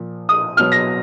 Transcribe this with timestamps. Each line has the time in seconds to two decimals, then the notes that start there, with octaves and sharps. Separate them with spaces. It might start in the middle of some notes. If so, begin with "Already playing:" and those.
Already playing: A#2 F3
0.29 D#6
0.57 B2 F#3 F6
0.72 A#6